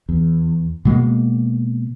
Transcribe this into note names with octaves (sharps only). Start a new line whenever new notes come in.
E2
B2 G#3 A#3